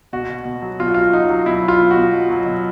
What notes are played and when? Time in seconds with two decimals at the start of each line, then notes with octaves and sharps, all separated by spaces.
0.13 B2 F#4
0.29 B2
0.45 B2
0.62 F#3
0.80 B2 F4
0.88 F#4
0.94 F#3 F4
1.12 F#3 D#4
1.29 F#3
1.46 B2 E4
1.63 F#3
1.68 F4
1.80 B2
1.91 F#4
1.96 B2
2.13 F#3
2.30 F#3
2.46 B2